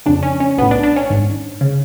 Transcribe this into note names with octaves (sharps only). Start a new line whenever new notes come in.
F2 C#3 D4
C#4
C#4
B1 A2 B3
D4
D4
C#4
G#1 G#2
C#3